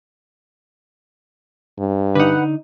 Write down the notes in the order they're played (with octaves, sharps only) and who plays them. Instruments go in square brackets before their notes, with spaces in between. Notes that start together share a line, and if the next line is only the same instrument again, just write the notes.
[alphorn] G2
[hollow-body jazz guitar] D3 D#4 [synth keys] B4 F#5